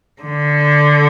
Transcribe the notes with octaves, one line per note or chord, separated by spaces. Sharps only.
D3